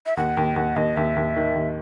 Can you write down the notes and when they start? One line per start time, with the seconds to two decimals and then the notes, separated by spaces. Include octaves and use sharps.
0.06 E5
0.17 D#2 F#5
0.37 D#2 G5
0.56 D#2 F#5
0.76 D#2 D#5
0.96 D#2 E5
1.16 D#2
1.36 D#3
1.55 D#2